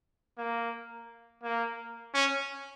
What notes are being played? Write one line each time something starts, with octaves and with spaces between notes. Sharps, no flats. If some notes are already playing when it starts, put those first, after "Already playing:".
A#3
A#3
C#4